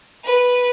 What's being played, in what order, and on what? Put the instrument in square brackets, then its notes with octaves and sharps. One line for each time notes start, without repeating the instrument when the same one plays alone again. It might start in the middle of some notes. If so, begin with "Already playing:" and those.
[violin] B4